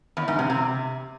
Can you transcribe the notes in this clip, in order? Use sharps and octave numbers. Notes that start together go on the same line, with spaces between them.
E2
G#2
C3
C3